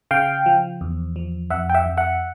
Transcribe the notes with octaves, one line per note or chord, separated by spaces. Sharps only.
C#3 F5 G5
F3
E2
F3
F2 E5 F#5
G5
E5 F#5
F2
E5 F#5